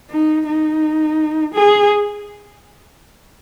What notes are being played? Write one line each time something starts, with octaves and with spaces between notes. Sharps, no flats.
D#4
D#4
G#4